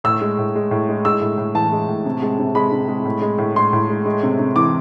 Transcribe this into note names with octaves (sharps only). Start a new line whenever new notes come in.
A2 E6
G#3
A2
G#3
A2
G#3
G#3 E6
A2
A2
E3 A5
G#3
A2
C3
G#3
C3
G#3 B5
C3
G#3
A2
G#3
A2
G#3 C6
A2
G#3
G#3
C3
C3
E3 D6